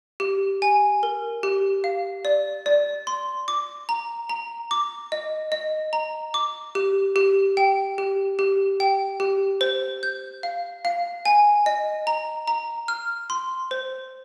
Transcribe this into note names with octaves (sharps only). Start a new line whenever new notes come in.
G4
G#5
A#4
G4
F5
D5
D5
C6
D6
A#5
A#5
D6
D#5
D#5
A#5
D6
G4
G4
G5
G4
G4
G5
G4
C5
G6
F5
F5
G#5
D#5
A#5
A#5
F6
C6
C5